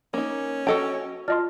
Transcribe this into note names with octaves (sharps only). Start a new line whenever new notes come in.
A#3 C#4 D#4
F#4 A4 D#5 G5 A5
F4 D5 D#5 A5 C6 F6